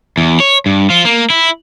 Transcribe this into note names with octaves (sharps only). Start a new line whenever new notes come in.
E2
C#5
G2
F3 F4
A#3
E4